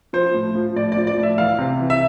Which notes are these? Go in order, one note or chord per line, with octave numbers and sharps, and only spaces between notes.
F3 C5
A2
F3
A2 D5
D5
F3
D5
A2
E5
E3 F5
C3
E3
E5